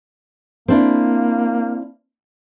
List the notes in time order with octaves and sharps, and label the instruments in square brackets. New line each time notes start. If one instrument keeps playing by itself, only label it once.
[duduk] A#3 [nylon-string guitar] C4 D4 E4